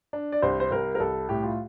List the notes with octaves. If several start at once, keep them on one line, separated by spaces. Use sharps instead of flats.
D4
D5
C2 C5
C5
C2 A#4
A#4
C2 A4
A2 G4
F4